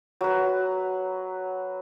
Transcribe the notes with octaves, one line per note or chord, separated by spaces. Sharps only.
F#3 B4